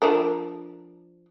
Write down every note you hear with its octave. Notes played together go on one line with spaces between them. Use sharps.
F3 D4 A#4